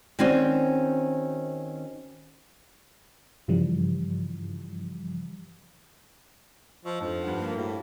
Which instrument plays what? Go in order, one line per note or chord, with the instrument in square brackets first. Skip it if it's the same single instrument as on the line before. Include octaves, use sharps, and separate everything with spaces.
[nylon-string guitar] D#3 C4 C#4 F#4 C5 D5
[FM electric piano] G2 C#3 E3 F3 G3
[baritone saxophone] F3 [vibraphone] D#5 C#6 E6
[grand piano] F2 [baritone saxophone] F3 [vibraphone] D4 D#4 A4
[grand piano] G2 F#5
[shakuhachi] A#3
[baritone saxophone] A2 [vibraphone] F#4 F5